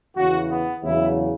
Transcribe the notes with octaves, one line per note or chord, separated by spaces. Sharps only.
E2 C#3 E3 F#4
B3
E2 C#3 F#3 E4